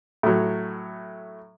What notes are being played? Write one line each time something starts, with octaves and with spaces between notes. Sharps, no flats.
A2 F#3